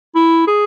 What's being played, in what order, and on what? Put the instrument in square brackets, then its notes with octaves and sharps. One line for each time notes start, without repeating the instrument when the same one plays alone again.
[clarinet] E4
G#4